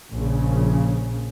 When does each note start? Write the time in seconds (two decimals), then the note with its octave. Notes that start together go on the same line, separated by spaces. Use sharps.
0.15 A#1 C#3